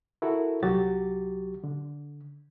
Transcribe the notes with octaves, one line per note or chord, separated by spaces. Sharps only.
E4 F#4 A4 A#4
C2 F#3 F#4 G4 A6
D3